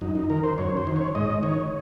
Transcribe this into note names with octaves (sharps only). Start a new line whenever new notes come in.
F#2 D#4
D#4
D#3 A#4
C5
F#2 C#5
C5
D#3
C#5
G#2 D#5
D#3 C#5